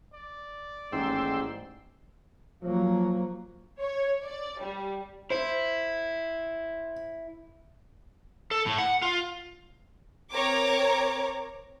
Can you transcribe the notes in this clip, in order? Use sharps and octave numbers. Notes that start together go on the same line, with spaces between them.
D5
A1 D#2 G#2 G5 C6 E6
F3 F#3 A#3
C#5
D5
G3
E4 C5
A4
A2
F#5
F4
C4 A#4 C#5 A#5 D6